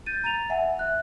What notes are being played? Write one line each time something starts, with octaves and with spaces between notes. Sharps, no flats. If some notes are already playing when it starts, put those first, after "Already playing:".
G6 A6 D#7
A#5 A6 D#7 F7
E5 F#5 G#5
E5 F#6